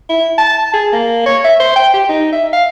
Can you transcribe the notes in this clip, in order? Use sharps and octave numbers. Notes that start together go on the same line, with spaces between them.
E4
A5
G#4
A#3
C#5
E5
C5
G5
G4
D#4
E5
F5